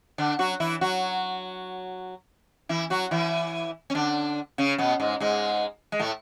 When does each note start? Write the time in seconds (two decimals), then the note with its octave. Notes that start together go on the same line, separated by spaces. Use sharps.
0.18 D3 D4
0.39 F#3 F#4
0.60 E3 E4
0.81 F#3 F#4
2.69 E3 E4
2.90 F#3 F#4
3.11 E3 E4
3.90 C#4
3.95 D3 D4
4.58 C#3 C#4
4.78 B2 B3
5.00 G#2 G#3
5.20 G#2 G#3
5.92 G#3
5.99 A2 A3